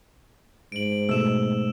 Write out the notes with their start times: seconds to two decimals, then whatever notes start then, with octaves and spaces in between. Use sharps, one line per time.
0.72 G#2 D7 F#7
1.09 B2 A3 E6 E7